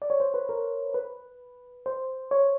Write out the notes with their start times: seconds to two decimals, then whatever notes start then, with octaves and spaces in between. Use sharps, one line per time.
0.02 D5
0.10 C#5
0.20 C5
0.34 B4
0.49 A#4
0.94 B4
1.86 C5
2.31 C#5